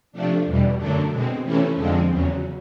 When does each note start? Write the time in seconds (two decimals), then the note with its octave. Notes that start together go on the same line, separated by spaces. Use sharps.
0.12 C3 F3 A3 D4
0.45 E2 B2 G3
0.77 F#2 D3 F#3 A3 D4
1.10 B2 G#3 C4
1.43 C3 E3 A3 C#4 E4
1.75 F2 D3 F3 G#3 C4
2.07 E2 C#3 F#3